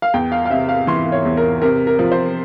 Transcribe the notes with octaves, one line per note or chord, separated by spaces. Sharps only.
F5
E2 G5
F5
F5
C3 E5
F5
E3 C6
C#5
E2
A#4
C3 A#4
A#4
F3
C5